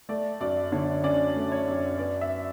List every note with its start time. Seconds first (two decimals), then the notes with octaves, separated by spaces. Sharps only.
0.09 A3 D5
0.40 F#2 D5
0.72 D3 C#5
1.04 C#4 D5
1.36 A3
1.52 C#5
1.67 F#2
1.99 B3 D5
2.21 E5